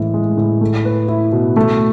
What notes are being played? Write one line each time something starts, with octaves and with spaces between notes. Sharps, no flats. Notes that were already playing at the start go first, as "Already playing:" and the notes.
Already playing: A2 E3 G#3
G#3
A2
A3
B4
E4
B2
A3